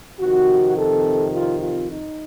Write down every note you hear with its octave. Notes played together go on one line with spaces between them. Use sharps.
F2 C3 D#3 F#4
A4
F4
F4
D#4